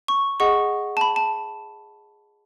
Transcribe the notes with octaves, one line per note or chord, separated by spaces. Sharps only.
C#6
G#4 D#5 F#5 C#6
A5
B5
A5